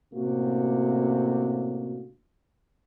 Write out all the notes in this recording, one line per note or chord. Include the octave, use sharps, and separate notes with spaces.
A2 C3 A#3 C#4 D4 F#4